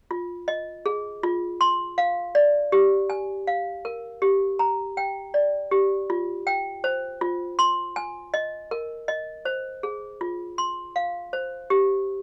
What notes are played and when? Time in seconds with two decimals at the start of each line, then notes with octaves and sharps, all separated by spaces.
0.11 F4
0.48 D#5
0.86 G#4
1.23 F4
1.61 C6
1.98 F5
2.35 D5
2.72 G4
3.10 G#5
3.47 F5
3.85 A#4
4.22 G4
4.59 A#5
4.97 G5
5.34 D5
5.71 G4
6.10 F4
6.47 G5
6.84 C5
7.21 F4
7.59 C6
7.96 G#5
8.34 D#5
8.71 A#4
9.08 D#5
9.45 C5
9.83 G#4
10.21 F4
10.58 C6
10.96 F5
11.33 C5
11.70 G4